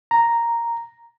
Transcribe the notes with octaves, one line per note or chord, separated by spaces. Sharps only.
A#5